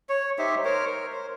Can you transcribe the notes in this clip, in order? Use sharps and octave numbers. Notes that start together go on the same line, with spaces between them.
C#5
D#4 G4 C5 E5
A#4 C5 C#5
A#4
C5